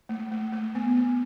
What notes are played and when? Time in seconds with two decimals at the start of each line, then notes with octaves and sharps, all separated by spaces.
0.09 A3
0.31 A3
0.53 A3
0.75 B3
0.97 B3